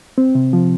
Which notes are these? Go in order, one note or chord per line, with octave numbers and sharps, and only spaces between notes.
C4
C3
F3